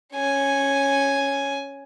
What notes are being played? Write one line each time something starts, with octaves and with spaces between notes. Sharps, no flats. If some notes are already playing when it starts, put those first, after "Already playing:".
C#4 G#5